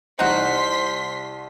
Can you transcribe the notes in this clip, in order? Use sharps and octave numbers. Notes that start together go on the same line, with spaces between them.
C2 D#4 F#4 C5 F#5 C6 B6 C7